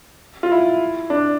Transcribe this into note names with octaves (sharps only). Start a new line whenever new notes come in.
F4
E4
D4